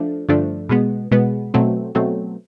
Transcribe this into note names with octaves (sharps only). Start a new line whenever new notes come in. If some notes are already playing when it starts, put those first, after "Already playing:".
Already playing: F3 A3 D4
G2 D3 F3 A3 D4
B2 G#3 B3
B2 G#3 B3
B2 F#3 A3 C4
B2 F#3 A3 C4